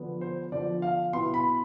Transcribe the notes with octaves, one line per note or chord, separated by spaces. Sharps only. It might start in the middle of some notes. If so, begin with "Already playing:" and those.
Already playing: D3 F3 B3 D4
C5
D3 F3 B3 D4 D5
F5
B2 B3 E4 C6
B5